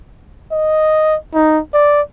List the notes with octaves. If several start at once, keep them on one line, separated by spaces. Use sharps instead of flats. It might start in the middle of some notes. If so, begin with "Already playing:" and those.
D#5
D#4
D5